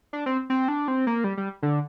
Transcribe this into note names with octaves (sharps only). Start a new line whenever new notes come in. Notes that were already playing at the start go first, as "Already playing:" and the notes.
D4
C4
C4
D4
C4
A#3
G3
G3
D3